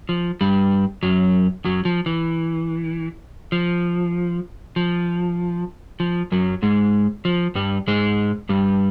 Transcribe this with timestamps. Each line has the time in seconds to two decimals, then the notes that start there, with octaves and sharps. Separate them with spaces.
0.09 F3
0.41 G2 G3
1.03 F#2 F#3
1.65 F#2 F#3
1.85 F3
2.06 E3
3.52 F3
4.76 F3
6.00 F3
6.32 F#2 F#3
6.62 G#2 G#3
7.25 F3
7.55 G2 G3
7.87 G#2 G#3
8.49 G2 G3